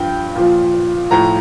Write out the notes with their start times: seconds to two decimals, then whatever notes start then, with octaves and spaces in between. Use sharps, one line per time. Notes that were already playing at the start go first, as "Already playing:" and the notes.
Already playing: G2 F3 G5
0.36 A#2 F3
1.11 A2 F3 A#5